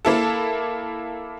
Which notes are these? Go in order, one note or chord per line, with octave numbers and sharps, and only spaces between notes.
A#3 E4 A4